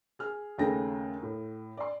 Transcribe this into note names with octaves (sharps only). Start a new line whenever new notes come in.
G#4 F6
D#2 C#3 A3 G#4 G5 A#6
A2
D5 C6